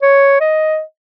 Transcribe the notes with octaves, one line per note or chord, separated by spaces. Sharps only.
C#5
D#5